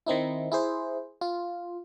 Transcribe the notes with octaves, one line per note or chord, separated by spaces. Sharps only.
D#3 C4 D#4 E4
E4 G#4 C5
F4